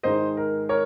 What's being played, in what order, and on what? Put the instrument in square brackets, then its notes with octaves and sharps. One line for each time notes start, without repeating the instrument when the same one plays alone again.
[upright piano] G#2 D#3 G#3 D#4 C5 D#5
A#4
A#4 C#5